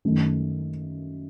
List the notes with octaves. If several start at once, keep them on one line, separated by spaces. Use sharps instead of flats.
F#2 D#3 A3